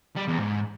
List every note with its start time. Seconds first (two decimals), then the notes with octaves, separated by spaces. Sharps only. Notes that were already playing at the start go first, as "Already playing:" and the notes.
0.16 G3
0.28 E2
0.39 G#2